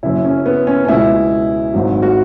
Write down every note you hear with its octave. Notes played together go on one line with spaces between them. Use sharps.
F#1 F#2 C#3 E4
C#4
B3
C#4
C#4
C#2 B2 G#3 E4
G#1 G#2 F#3
F#4